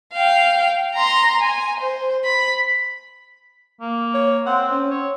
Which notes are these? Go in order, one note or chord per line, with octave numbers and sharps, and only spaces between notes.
F5 G5
A#5 C6
G#5
C5
B5
A#3
C#5
C4 F#5
C#4
C#5